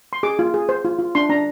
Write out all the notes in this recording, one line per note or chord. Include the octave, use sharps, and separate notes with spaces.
C6
G#4 D6
F4
G#4
C5
F4
F4
D4 C6
D4 A#5